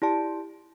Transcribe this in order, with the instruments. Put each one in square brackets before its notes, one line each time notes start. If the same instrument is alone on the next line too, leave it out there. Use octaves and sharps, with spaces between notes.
[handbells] E4 G4 D5 A5